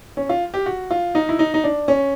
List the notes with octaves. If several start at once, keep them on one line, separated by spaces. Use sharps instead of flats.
C#4
F4
G4
F#4
F4
D#4
E4
D#4
D#4
D4
C#4